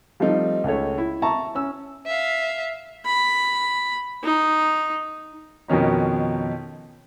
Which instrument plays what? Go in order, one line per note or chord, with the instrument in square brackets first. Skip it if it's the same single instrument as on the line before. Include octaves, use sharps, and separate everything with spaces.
[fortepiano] F3 G3 A3 C4 D#4
C#2 C#3 A3 C#5
E4
E5 A5 A#5 C#6
C#4 E6
[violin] E5 F5
[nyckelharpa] B5
D#4
[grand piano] F2 B2 D#3 C#4 D#4